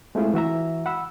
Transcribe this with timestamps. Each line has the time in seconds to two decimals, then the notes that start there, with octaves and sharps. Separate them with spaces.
0.15 G#3 A3 C4 E4 F4 G#4
0.34 E3 F#4 E5 A#5
0.86 F#5 B5 E6